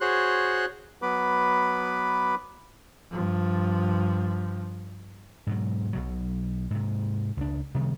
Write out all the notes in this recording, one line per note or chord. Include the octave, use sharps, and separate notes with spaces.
F#4 G#4 C5 C#5 C6 F#6
F#3 B3 B4 B5 D6
G2 F3
G#2 B2 F#3
B1 B2 F#3
G#2 C3
C#2 D4
C3 D#3 G3 B3